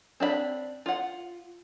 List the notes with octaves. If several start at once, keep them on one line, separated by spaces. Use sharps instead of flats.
C4 D4 F5 B5
F4 F#5